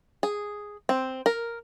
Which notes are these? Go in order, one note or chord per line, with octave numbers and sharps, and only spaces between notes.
G#4
C4
A#4